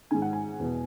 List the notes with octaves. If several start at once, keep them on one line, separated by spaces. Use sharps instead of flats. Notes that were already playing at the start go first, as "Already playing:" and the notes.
G#2 D#3 G#5
F#5
G#5
E2 B2